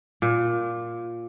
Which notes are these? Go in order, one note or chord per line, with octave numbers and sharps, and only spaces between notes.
A#2